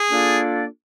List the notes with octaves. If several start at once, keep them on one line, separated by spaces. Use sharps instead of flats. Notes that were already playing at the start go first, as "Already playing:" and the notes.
Already playing: G#4
A#3 D4 F4 A4 D5